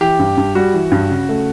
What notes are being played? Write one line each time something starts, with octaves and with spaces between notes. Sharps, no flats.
E3 G4
G2
G2
G3 F#4
E3
G2
C#3
A3